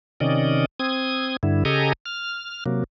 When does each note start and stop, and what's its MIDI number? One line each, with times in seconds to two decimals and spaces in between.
0.20 0.65 48
0.20 0.65 51
0.20 0.65 61
0.20 0.65 74
0.20 0.65 75
0.80 1.37 60
0.80 1.37 87
0.80 1.37 92
1.43 1.64 43
1.43 1.64 50
1.43 1.64 64
1.65 1.93 49
1.65 1.93 67
1.65 1.93 69
1.65 1.93 75
1.65 1.93 80
1.65 1.93 82
2.06 2.64 89
2.66 2.84 48
2.66 2.84 54
2.66 2.84 58